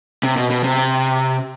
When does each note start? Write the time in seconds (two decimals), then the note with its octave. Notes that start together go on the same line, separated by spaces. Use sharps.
0.23 C3
0.37 B2
0.50 B2
0.64 C3